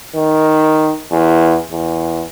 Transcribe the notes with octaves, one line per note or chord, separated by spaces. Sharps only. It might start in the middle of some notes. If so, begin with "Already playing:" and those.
D#3
E2
E2